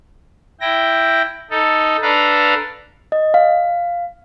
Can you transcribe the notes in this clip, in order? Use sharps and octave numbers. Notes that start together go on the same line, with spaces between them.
E4 G5 A#6
D#4 A4
D4 A4 B4 F5 A#5
D#5
F5